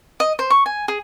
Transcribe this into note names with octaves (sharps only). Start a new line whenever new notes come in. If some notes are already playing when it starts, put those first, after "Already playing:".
D#5
C5
C#6
G#5
G#4